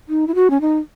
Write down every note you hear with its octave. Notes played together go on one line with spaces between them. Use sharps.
D#4
E4
F#4
C#4
D#4